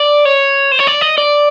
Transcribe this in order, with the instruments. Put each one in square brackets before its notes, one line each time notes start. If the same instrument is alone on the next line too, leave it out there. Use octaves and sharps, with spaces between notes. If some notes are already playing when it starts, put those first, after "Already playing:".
Already playing: [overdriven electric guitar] D5
C#5
C5
C#5
D5
D#5
D5